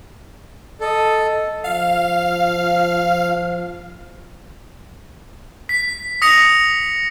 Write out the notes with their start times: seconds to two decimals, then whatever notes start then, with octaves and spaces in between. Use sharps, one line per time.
0.81 A4 D#5
1.64 F3 F5
5.69 B6
6.22 D#6 A#6 B6 C#7 F7